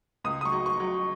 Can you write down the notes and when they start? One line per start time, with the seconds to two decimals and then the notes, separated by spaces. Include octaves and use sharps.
0.24 C#2 D#6
0.41 D#6
0.45 C#6
0.52 F#3
0.66 C#6
0.80 F#3